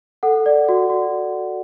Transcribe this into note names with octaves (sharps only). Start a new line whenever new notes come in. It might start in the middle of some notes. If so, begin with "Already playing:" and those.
A4 F#5
D5
F#4
F#4